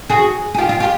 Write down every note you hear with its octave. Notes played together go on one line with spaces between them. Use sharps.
F#4 G#4
G#4
F4 G4
F4 G4
F4 G4